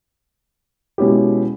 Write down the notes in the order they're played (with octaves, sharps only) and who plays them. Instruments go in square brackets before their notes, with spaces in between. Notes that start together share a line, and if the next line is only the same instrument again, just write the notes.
[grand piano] B2 G#3 C#4 E4 G4